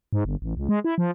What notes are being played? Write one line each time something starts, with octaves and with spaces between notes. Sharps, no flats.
G#2
G1
A1
C#2
G#3
E4
F3